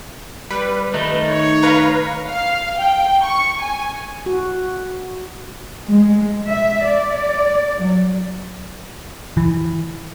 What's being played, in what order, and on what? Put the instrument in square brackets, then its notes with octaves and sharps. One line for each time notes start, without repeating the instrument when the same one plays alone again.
[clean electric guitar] G3 [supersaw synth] B4
[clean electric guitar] D#3 A3 D#4
[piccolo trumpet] C#5
[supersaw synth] B4 F5 A#5
[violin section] F5
G5
C#6
G#5
[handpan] F#4
[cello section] G#3
E5
D5
F#3
[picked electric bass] E3